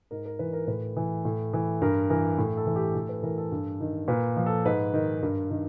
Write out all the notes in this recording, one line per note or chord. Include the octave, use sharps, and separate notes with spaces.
G#2 A#4
A#4
E3 B4
A#4
A2 B4
E3
A2
E3
G2 A#4
E3 A#4
A2
A4
E3
G4
A2 A4
B4
E3 A#4
A4
G2
D#3
A#2 B4
F3
A4
G#2 B4
D#3
G2 A#4
D#3